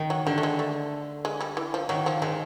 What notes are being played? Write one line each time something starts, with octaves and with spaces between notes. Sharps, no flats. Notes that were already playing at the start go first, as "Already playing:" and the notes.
Already playing: D#3
F#3
D3 G3
A3
G#3
A3
G#3
G3
E3
F3
D#3 F#3
F3
D#3 G#3